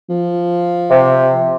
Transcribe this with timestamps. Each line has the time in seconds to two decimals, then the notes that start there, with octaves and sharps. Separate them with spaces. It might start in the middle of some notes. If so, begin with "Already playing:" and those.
0.09 F3
0.90 C3